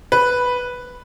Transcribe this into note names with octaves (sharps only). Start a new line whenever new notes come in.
B4